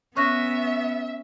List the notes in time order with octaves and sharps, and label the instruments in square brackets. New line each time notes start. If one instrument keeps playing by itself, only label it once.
[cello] B3 [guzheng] C#4 [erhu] E5 [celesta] C#6 F#6 A#6